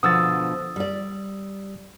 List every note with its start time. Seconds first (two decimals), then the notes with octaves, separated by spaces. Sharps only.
0.03 B2 D3 F3 D#6 E6 A6
0.76 G3 D5